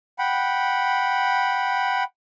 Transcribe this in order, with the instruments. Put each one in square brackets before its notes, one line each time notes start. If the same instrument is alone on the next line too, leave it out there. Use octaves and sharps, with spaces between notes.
[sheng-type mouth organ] F#5 G5 B5